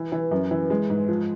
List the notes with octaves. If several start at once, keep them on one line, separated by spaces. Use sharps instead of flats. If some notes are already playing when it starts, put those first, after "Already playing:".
Already playing: E3
E3
F#2
E3
G#3
G#2
F3